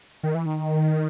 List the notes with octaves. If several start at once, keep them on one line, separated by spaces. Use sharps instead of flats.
D#3
E3
D#3